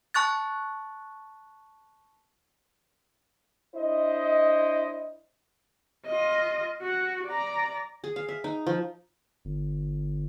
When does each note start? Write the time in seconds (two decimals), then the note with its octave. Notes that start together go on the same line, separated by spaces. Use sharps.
0.14 A5 C#6 F#6 A6
3.76 D4 E4 C5 D#5
6.06 F4 D#5
6.82 F#4
7.27 D5 A#5
8.04 G#4
8.16 F5
8.29 E5
8.44 D#4
8.67 F3
9.45 G1